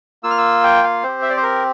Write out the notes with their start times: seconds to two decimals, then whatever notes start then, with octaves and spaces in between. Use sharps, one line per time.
0.23 A#3 F4 E6
0.31 F6
0.38 E6
0.64 G5
0.84 F5
1.03 C4 G4 C5
1.22 E5
1.30 D5
1.37 C5
1.43 A#4